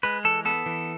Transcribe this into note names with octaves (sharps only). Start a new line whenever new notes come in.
G#3 B4
E3 A4
B3 A4
E3